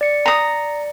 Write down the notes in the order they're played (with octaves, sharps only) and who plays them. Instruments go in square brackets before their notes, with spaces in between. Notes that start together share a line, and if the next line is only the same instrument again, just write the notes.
[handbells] D5 C#7
[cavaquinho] A#5 D#6